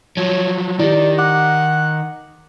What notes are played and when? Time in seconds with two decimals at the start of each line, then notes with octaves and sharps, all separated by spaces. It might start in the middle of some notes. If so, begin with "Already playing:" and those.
0.17 F3 F#3 C#5
0.79 D#3 E4 G4 D5
1.18 F#5 D6